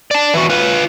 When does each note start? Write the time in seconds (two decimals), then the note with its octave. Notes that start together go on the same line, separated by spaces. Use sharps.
0.11 D5 A5
0.34 E3 F#4
0.50 F4 B4